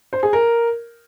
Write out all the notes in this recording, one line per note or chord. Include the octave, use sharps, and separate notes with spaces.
C5
G#4
A#4